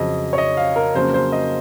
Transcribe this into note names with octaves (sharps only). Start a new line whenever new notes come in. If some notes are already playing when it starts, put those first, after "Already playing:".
Already playing: F2 C#3 F#3 D#5
C#5
D#5
F5
A#4
F2 C#3 F#3 A#3 C#4 C5
C5
D#5